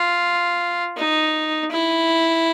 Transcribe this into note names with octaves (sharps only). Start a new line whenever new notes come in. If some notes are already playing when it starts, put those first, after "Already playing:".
Already playing: F4
D#4
E4